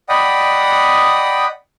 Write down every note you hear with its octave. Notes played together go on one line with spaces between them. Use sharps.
D5 D#5 F#5 G5 B5 D#6